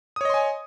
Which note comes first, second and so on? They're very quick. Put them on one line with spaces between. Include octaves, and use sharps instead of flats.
D#6 C#5 D#5 C6 G#5